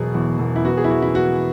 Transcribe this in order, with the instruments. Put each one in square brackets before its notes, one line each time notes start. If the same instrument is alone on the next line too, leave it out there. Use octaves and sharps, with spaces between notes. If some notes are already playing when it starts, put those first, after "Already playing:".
Already playing: [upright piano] E1 B2 F#3 G#4
E2
E1
E4
B3 F#4
G#4
E4
E3 F#4
E4
B3 F#4